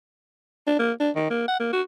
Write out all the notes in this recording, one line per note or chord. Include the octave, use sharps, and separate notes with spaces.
D4
A#3
D4
D#3
A#3
F#5
A#3
F#4